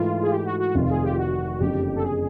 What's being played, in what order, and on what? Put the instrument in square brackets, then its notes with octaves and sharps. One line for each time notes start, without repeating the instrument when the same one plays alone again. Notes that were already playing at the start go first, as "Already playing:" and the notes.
Already playing: [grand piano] G#2 E3 A3 [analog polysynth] F4
[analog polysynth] G#4
G4
F#4
F#4
[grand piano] F1 F2 C3 D#3 [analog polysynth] F4
[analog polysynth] G#4
G4
F#4
[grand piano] F#1 F2 D3 [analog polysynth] G4
[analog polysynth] A4
G#4